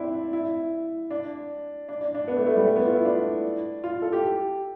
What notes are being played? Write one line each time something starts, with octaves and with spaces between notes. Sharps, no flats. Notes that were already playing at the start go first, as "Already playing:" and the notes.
Already playing: C4 D4 E4
E4
D4
D4
D4
D4
B3
A3
A3
G3
A3
B3
F4
E4
D4
F4
A4
G4